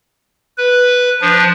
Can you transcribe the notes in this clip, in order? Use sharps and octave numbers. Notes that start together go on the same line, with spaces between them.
B4
F3 D4